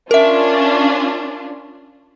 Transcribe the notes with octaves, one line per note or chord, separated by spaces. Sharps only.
C#4 D4 F4 A#4 E5